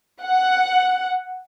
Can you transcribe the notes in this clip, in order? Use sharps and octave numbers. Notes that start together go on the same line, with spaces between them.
F#5